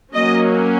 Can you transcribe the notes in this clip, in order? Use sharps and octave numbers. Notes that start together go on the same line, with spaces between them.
F#3 A#3 C#4 D#5